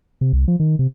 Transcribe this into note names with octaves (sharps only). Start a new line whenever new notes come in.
C3
C2
F3
D#3
C3